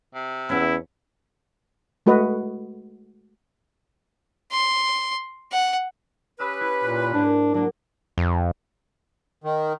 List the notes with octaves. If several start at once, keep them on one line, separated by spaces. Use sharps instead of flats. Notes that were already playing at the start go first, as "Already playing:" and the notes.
C3
E2 B3 C#4 E4
G#3 A3 F#4 B4 D#5
C6
F#5
C#4 G4 B4 D#6 E6
E4
A#2
G#2 A#3 D4
F#3 A#3 D4
F2
D#3